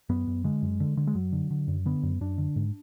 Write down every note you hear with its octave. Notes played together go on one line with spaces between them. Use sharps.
F#2 B3
F#2
D3 G#3
F#2
D3
D3
G#3
F#2 F#3
D3
D3
F#2
D3 B3
F#2
F#2 D4
D3
G#2